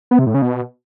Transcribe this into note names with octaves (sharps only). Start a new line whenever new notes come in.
B3
C3
A2
C#3
B2